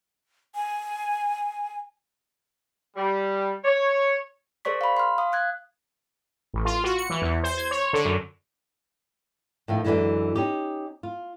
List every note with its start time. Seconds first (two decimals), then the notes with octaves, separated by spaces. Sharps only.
0.55 G#5
2.96 G3
3.64 C#5
4.65 G#4 A#4 C5 D5 C#6 B6
4.81 F5 B5
4.97 C6 F6
5.18 F5 D#6
5.32 F5 F#6 G#6
6.54 A1
6.65 F4
6.84 F#4
6.98 C#7
7.10 E3
7.22 E2
7.43 C5
7.58 G#6
7.71 C#5
7.93 D3
8.05 F#2
9.68 A2 D#3 F3
9.85 F#2 A2 D3 E3 G#3
10.35 C#4 D#4 G4
11.03 F4